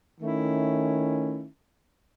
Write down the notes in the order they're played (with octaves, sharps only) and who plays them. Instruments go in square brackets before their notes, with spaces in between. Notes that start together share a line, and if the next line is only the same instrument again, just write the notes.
[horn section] D#3 A3 C#4 E4